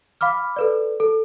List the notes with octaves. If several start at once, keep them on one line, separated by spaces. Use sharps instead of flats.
F5 B5 D6 F6
A4 B4 D5
A4